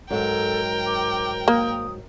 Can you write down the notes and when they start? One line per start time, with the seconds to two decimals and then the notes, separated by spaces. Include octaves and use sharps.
0.10 G#2 F#3 A4 A#4 G5
0.86 D6
1.48 A#3 D#6